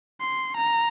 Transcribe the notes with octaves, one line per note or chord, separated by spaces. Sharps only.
C6
A#5